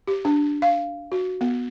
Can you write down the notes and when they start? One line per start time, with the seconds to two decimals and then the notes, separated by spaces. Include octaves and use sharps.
0.07 G4
0.25 D4
0.62 F5
1.12 F#4
1.41 B3